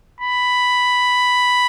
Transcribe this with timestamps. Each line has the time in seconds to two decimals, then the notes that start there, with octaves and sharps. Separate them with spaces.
0.21 B5